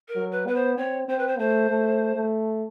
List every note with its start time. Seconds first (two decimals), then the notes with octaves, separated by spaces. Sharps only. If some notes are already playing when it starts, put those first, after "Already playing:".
0.08 A#4
0.16 F#3
0.32 B4
0.47 B3 B4
0.55 C5
0.78 C4 C#5
1.08 C4 C5
1.18 B4
1.28 C5
1.39 A3 C5
1.70 A3
2.16 A3